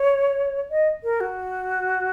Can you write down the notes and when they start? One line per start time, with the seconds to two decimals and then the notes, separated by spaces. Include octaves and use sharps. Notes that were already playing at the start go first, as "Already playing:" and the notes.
Already playing: C#5
0.71 D#5
1.04 A#4
1.20 F#4